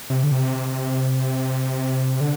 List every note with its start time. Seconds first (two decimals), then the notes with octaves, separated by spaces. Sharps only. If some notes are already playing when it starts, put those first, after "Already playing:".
0.10 C3
0.23 D3
0.32 C3
2.21 D3